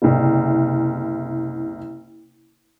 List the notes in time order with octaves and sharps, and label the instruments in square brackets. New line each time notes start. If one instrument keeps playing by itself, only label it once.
[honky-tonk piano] F#1 C2